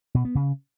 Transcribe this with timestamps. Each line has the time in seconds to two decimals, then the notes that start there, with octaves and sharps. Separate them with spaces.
0.15 B2
0.25 B3
0.35 C#3